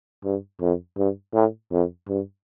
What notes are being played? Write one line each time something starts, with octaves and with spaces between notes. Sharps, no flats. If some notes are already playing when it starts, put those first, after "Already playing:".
G2
F2
G2
A2
F2
G2